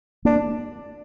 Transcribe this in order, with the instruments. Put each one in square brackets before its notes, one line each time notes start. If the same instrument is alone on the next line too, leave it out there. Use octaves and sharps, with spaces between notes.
[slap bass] A#3 [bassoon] D4